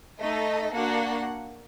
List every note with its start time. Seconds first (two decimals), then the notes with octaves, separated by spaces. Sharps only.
0.20 A3 D#4 A4 D#5
0.72 A#3 D4 F#4 F#5